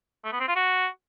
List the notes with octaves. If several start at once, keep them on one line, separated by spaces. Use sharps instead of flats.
A3
B3
C4
F4
F#4